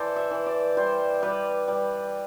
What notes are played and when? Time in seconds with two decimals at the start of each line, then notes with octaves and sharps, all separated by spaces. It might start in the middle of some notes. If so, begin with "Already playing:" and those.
Already playing: E3 A4 C5 D5
0.16 E5
0.31 E3
0.46 D5
0.77 G3 C5
1.23 G3 B4
1.68 G3